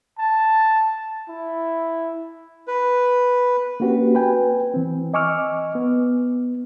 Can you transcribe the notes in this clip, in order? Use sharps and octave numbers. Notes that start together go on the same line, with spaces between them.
A5
E4
B4
A#3 C4 C#4 F#4 G4 B4
B4 G5 G#5
E3 C4
D#5 G#5 C#6 D6 E6 F6
B3